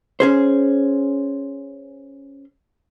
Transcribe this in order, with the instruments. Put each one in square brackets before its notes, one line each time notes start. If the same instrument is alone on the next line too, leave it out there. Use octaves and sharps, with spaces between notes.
[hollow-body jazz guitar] C#4 G#4 C5